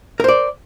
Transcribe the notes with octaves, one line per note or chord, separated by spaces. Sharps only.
A#4 C5 D5